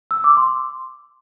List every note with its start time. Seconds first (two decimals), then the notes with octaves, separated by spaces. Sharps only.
0.11 E6
0.24 D6
0.37 C6